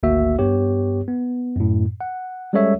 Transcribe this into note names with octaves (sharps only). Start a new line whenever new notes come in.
G#1 D2 A#3 F#4 E5
G2 B3 G4 C#5
B3
F#2 A2
F#5
G3 G#3 C#4 A4 C#5 E5